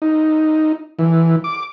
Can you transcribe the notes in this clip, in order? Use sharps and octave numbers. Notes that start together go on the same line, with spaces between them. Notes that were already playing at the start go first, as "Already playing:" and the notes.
D#4
E3
D6